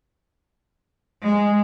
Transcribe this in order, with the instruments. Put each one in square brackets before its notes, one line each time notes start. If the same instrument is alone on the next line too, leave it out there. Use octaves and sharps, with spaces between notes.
[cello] G#3